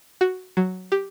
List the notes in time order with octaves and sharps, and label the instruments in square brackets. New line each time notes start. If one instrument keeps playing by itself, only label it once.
[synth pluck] F#4
F#3
G4